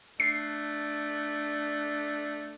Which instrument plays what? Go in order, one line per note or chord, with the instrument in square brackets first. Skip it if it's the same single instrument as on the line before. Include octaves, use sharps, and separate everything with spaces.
[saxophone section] A3 D4 [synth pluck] C7